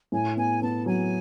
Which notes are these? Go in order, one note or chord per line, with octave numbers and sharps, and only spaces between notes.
A2 G#5
B3 G#5
B3 A5
F#3 G#5